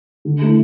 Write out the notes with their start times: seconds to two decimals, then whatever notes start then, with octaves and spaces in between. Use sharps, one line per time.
0.25 D3
0.42 A3 E4